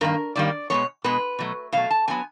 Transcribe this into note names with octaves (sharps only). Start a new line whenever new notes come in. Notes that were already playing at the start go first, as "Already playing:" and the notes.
G2 D#3 A#3 A#4
G2 D#3 G3 A#3 D5
B2 G#3 B3 C#5
B2 G#3 B3 B4
B2 F#3 A3
B2 F#3 A3 F5
A5
C#3 F#3 B3 G#5